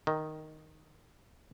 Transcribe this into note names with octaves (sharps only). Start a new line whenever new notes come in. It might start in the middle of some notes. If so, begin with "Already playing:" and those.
D#3